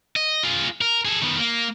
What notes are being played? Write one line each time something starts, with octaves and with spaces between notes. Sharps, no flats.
D#5
F4 G#4
A#4
G#4 A4
D#3 B3
A#3